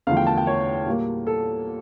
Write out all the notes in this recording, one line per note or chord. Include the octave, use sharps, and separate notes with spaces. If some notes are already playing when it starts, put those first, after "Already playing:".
E2 D3 F3 A3 F5
G5
A5
G5
C#5
A#2 G3 A#3
A4